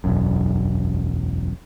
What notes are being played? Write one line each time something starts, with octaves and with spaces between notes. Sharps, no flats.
E1 B1 F#2